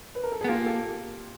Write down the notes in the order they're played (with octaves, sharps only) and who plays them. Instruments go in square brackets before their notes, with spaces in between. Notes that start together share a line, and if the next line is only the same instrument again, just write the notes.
[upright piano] B4
A#4
A4
G#4
[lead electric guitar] B3
[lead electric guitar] A#3 [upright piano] F4 G4
[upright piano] G4 A4